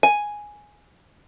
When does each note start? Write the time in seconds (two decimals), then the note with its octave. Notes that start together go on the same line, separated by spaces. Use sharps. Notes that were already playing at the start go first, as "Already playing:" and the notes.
0.03 G#5